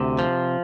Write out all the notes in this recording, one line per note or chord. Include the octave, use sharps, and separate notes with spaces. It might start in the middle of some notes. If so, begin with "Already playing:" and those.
Already playing: D2 C3
F3